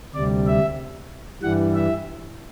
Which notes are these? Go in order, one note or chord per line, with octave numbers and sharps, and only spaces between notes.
D2 C3 G3 D5
E5
G2 E3 G3 F#5
E5